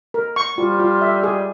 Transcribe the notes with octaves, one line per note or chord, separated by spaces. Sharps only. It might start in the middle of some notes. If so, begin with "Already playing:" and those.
A#4
C#6
G3 F4
F4
E5
G#4